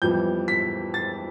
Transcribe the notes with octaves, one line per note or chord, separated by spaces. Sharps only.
F2 E3 G3 B3 G6
B6
A6